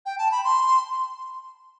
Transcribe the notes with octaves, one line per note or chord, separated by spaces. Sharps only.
G5
A5
B5
C6